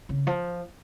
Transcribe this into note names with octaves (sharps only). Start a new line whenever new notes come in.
C#3
F3